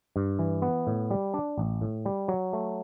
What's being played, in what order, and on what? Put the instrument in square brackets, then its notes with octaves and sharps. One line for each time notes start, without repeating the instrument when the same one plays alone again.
[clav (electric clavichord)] G2
E3
B3
A2
G3
D4
A1
A2
G3
F#3
A3